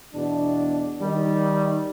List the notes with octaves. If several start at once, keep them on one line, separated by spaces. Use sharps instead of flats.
E2 B2 D4
D#3 G3